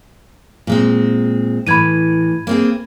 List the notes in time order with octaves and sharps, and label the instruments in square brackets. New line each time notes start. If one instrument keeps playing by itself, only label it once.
[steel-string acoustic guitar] A#2 G#3 C4
[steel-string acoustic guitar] A2 E3 [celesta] B5 G#6 D#7
[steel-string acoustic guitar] A#3 C4 G#4